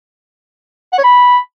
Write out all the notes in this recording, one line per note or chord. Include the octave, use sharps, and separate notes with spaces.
F#5
C#5
B5